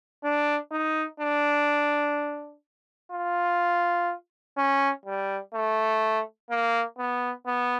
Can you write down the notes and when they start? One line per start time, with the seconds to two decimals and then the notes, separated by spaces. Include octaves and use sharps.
0.24 D4
0.71 D#4
1.20 D4
3.12 F4
4.57 C#4
5.05 G3
5.54 A3
6.50 A#3
6.98 B3
7.46 B3